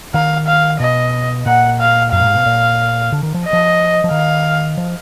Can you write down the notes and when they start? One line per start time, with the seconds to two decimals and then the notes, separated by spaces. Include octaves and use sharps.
0.14 D#3 F5
0.47 F5
0.80 B2 D#5
1.46 A#2 F#5
1.80 F5
2.12 F#2 F5
2.20 A#2
2.24 G#2
2.35 B2
2.46 A#2
3.12 D3
3.23 D#3
3.34 F3
3.45 D#5
3.53 F3
4.04 F3
4.11 D#3 F5
4.78 F3